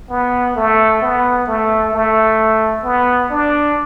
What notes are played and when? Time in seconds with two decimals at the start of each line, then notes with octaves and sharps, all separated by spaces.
0.10 B3
0.56 A3
1.02 B3
1.47 A3
1.93 A3
2.84 B3
3.30 D4